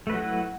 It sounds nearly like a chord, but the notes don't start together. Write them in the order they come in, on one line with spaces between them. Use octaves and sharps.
A3 B4 F#3 F#4 E4